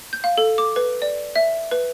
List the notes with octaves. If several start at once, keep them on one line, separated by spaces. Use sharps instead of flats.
G6
F5
A4
D6
B4
D5
E5
B4